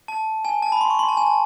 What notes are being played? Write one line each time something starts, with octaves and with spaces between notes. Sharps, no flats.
A5
G#5
A5
B5
C6
C#6
C6
A5
G#5
A5